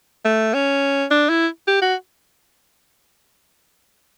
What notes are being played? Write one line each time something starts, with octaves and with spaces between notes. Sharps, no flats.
A3
C#4
D4
E4
G4
F#4